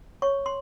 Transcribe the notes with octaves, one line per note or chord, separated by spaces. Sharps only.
C#5 C#6
C6